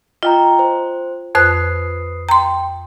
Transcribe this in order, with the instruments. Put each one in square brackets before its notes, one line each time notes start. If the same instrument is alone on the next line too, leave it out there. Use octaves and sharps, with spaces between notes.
[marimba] F4 [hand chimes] D#5 G5 A#5
[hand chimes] C5
[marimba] F2 C5 F#6 [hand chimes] B4 D#6 C7
[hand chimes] G5 [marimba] A#5 C6